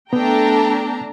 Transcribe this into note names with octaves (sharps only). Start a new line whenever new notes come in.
A3 B3 D4 A4 G5 A#5